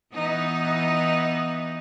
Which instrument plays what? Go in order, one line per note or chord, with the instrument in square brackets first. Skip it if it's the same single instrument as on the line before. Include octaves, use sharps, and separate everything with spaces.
[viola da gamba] E3 B3 D#4